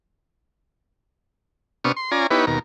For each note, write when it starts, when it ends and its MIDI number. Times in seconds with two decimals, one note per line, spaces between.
1.84 1.92 48
1.84 1.92 59
1.84 1.92 62
1.84 1.92 85
1.84 1.92 87
1.84 1.92 89
1.96 2.11 84
2.11 2.27 61
2.11 2.27 65
2.11 2.27 74
2.11 2.27 80
2.11 2.27 82
2.31 2.45 59
2.31 2.45 63
2.31 2.45 64
2.31 2.45 67
2.31 2.45 71
2.31 2.45 73
2.47 2.59 39
2.47 2.59 47
2.47 2.59 70